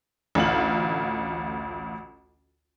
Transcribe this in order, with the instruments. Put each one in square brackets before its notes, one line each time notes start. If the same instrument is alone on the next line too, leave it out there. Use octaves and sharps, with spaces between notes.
[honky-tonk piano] A1 D2 F4 F#7